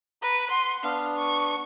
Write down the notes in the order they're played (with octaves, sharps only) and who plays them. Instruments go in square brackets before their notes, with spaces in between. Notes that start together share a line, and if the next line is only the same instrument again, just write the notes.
[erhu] B4 [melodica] A#5
[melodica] F#5 [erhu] C6
[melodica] B3 D4 [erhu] F5
[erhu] C#6